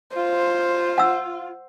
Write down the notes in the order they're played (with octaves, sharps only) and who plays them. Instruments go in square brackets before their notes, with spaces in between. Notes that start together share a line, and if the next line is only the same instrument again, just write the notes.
[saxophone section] F4 [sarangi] C5
[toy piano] F#5 E6